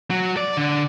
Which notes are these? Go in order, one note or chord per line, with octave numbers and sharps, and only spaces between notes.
F#3
D5
D3